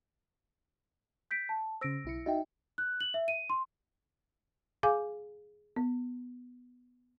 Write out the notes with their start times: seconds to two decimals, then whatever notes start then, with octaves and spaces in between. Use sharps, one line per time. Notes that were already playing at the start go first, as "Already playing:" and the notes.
1.31 G6 B6 D7
1.49 A5
1.81 C#3 C5 E6 A#6 D7
2.05 B1 E4 C#7
2.26 D#4 F#4 D#5 E5 G5
2.78 F#6
3.01 F#7
3.14 E5
3.28 D#7
3.50 C6
4.83 G#4 F5 G#5 D6
5.76 B3